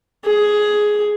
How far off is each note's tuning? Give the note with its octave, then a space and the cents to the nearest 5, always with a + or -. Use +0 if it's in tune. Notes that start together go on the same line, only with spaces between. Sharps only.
G#4 +10